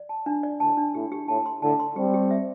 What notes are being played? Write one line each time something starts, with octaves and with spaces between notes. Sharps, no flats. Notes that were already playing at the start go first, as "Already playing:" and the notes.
Already playing: D5
A5
D4
D5
A2 D3 A5
D4
A2 G4
G4
A2 A5
C6
A2 D3 A5
C6
G3 C4 G4
G4
E5